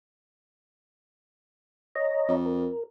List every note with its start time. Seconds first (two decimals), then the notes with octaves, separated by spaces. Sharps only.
1.96 C#5 D#5 A#5
2.28 F2
2.46 A#4